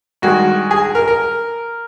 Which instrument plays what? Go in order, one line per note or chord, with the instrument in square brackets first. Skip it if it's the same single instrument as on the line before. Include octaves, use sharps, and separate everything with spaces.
[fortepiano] G2 D#3 G#3 F#4
G#4
A#4
A#4